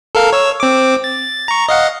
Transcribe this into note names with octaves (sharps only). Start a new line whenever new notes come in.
A4 A#4 F5
C#5 E6
C4 D6
A6
A#5 C#6
D#5 F5 F#5